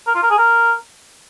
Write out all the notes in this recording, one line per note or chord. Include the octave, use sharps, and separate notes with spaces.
A#4
F4
A#4
G#4
A#4